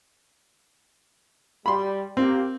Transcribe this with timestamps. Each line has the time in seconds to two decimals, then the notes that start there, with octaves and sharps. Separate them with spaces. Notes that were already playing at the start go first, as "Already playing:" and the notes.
1.66 G3 B5 C6
2.17 A#3 C4 F4 G4